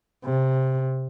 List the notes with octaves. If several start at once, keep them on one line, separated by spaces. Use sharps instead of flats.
C3